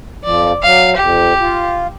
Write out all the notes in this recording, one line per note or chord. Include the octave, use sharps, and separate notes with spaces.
F2 F3 D5
F#3 F5
F2 G4
F4